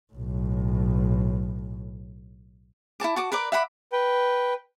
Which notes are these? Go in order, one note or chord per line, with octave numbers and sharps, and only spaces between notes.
B1 A2
E4 A4 A5 D6
F#4 A5 D6
A#4 B4 D5 D6
E5 F#5 B5 D6
B4 G5